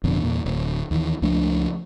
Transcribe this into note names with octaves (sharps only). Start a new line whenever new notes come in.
F1 F2 B2 D3
E2 A#2
D1
D#2 E3
C#2 F3 A3 D4